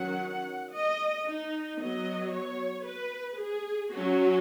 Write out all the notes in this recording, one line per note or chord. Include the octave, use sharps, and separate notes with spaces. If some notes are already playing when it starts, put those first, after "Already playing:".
Already playing: D#3 F#3 C#4 F#5
D#5
D#4
F#3 B3 D#5
C#5
B4
G#4
F#3 C#4 F#4